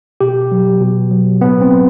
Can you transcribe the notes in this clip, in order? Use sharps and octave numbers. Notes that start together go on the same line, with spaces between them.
B2 G4
F#3
B2
F#3
A2 B3
C4
F#3